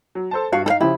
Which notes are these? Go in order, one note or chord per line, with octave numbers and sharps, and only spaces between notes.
F#3
A4 C5 A5
G2 F#4 F5
D#4 A4 F5
C#3 F3 E4 G4